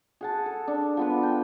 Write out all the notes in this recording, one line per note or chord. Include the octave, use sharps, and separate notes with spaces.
G#4 F#5 A5
A4
D4
F3 B3 B4
G5